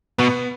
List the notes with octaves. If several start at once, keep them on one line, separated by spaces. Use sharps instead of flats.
B2 B3